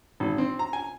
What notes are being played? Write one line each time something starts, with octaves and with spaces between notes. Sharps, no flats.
G#1
C4
A#5
G#5